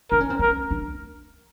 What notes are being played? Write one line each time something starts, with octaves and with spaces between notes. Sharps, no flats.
D4 A#4
C#4
C4
C#4 A#4
D4